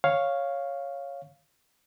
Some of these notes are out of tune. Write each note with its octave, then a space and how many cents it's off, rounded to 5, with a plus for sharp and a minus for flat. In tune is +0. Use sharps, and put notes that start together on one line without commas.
C#5 +0 F5 +0